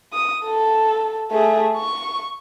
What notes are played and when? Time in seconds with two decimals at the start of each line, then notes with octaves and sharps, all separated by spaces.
0.13 D#6
0.45 A4
1.32 A3 G#4
1.76 C#6